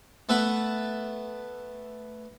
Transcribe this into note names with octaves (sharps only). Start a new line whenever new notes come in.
A3 B3 A4 B4